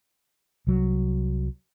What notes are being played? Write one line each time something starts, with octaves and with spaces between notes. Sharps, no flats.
C2 F#3